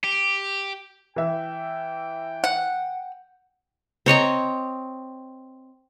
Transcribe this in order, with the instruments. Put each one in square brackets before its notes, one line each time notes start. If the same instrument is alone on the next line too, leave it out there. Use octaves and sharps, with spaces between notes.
[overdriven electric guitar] G4
[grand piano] E3 E5 [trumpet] G5
[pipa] F#5
[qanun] C4 C#5 D#5 A#5